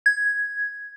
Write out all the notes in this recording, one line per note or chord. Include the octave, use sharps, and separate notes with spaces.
G#6